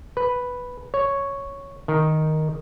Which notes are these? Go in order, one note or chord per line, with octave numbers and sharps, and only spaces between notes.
B4
C#5
D#3